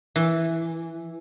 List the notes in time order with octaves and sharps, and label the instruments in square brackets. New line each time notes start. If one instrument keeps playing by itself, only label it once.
[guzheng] E3